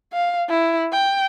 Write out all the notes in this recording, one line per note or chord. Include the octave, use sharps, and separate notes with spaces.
F5
E4
G5